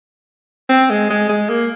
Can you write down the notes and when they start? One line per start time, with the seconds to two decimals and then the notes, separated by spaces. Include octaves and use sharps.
0.69 C4
0.90 G#3
1.10 G#3
1.29 G#3
1.49 A#3